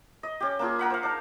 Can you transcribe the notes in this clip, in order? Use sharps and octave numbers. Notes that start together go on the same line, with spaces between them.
D#5
C#4 G4
A#3 D4 F4 G#4
A#4 F#5 B5
C5 F5
D4 D#4